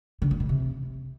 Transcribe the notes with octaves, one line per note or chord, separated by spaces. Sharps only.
D3
A#2
B2
C3